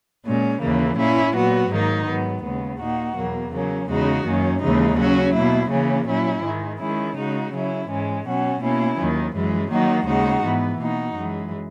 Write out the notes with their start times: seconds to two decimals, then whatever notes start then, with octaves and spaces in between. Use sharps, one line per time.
0.24 A#2 G#3 C#4
0.61 D#2 C#3 E3 A#3
0.97 A#2 A#3 C#4 E4
1.33 A#2 F#3 B3 F#4
1.70 G#2 D#3 F#3 A#3 D#4
2.06 G#2 F#3 B3
2.42 D#2 C#3 G#3 B3
2.79 A#2 A#3 D#4 F#4
3.15 E2 B2 F#3 A#3
3.52 C#3 F#3 A#3 C#4
3.88 E2 C#3 G#3 D#4 F#4
4.24 F#2 D#3 A#3 C#4
4.61 D#2 C#3 E3 G#3 D#4
4.97 C#3 F#3 C#4 F#4
5.33 B2 A#3 E4
5.69 C#3 E3 A#3 C#4
6.06 A#2 F#3 C#4 E4
6.42 G#2 D#3 G#3
6.79 D#3 G#3 C#4 E4
7.15 C#3 G#3 D#4 F#4
7.51 C#3 F#3 C#4 E4
7.87 G#2 E3 G#3 C#4
8.24 B2 F#3 C#4 F#4
8.60 B2 A#3 C#4 E4
8.97 D#2 D#3 F#3
9.34 F#2 E3 G#3
9.70 D#3 F#3 A#3 D#4 F#4
10.06 D#2 C#3 G#3 D#4 F#4
10.42 G#2 E3 B3
10.79 B2 A#3 D#4 F#4
11.15 F#2 E3 G#3